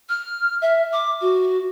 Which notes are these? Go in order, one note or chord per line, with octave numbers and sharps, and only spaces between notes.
F6
E5
D6
F#4